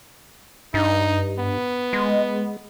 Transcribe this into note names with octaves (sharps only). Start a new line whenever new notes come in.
G2 D#4
B3
G#3